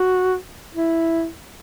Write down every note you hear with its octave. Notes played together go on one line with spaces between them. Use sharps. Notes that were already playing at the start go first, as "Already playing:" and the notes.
Already playing: F#4
E4